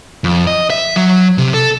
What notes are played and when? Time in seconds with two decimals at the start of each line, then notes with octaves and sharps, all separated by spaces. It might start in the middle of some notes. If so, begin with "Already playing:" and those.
0.24 F2
0.47 D#5
0.70 E5
0.96 F#3
1.38 C3
1.54 A4